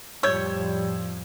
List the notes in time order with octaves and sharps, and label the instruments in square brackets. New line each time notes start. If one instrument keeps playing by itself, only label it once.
[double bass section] F2 A2 F3 [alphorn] G3 [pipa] C#5 [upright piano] E6 G6 G#6